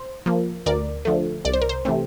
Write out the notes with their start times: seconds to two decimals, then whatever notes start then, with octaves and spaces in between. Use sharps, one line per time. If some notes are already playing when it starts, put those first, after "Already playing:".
Already playing: C5
0.26 F3 A#3
0.66 D2 A#4 D5
1.05 D3 F3 A3
1.45 C2 D5
1.54 C5
1.62 A#4
1.69 C5
1.85 C3 E3 A3 C4